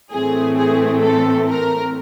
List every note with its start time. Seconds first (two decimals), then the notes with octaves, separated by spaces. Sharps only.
0.11 A2 E3 A3 C4 G#4
0.56 G#4
1.02 A4
1.48 A#4